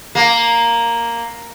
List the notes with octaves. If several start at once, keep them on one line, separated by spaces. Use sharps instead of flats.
A#3